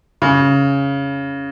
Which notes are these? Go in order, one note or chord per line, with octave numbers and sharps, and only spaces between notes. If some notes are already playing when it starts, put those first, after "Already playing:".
C#3